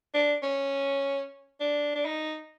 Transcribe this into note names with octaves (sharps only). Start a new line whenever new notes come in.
D4
C#4
D4
D4
D#4